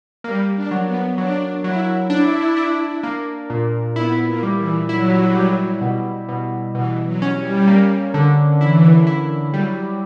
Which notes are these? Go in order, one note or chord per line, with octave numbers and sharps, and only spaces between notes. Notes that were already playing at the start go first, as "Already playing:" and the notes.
G3 A#3
D4
F#3
B3
F#3 D4
F#3 E4
D4 E4
D4
A#3
A#2
B3 E4
A#3
G3
E3
F#3 E4
G3
B2
B2
B2 E3
F#3
C#4
G3
A#3
D3
E3 E4
E4
F#3 G3